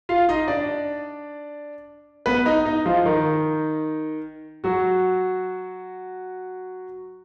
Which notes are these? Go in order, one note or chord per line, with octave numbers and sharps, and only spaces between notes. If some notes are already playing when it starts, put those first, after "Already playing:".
F4 F5
D#4 D#5
D4 D5
B3 B4
D#4 D#5
D#4 D#5
F3 F4
D#3 D#4
F#3 F#4